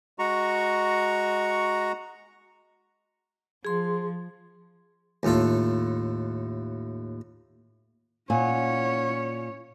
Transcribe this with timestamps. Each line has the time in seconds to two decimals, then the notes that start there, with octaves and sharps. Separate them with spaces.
0.19 G#3 F#4 A#5 C#6
3.65 F3 G#4 C6
5.23 D#2 A2 F4 A4
8.30 A#2 C#4 C#5 F#5 G#5